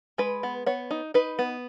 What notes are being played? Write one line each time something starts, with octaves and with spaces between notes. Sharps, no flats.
G#3 B4
B3
B3 C#5
D#4
D#4 B4
B3